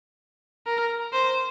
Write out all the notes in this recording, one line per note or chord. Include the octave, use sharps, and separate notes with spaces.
A#4
C5